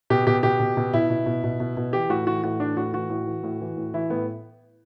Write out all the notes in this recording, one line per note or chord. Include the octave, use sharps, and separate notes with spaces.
B2 G4
B2 G4
B2 G4
B2
B2
B2 E4
B2
B2
B2
B2
B2
E3 G4
A2 F#4
E3 F#4
A2 F#4
E3 D4
A2 F#4
E3 F#4
A2
E3
A2
E3
A2
E3 E4
A2 B3